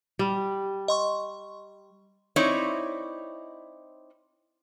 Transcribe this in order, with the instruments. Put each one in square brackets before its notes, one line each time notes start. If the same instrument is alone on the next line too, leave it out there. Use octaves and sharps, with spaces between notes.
[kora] G3
[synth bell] D#5 C6 C#6
[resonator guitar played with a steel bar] C4 D#4 E4 C#5 D5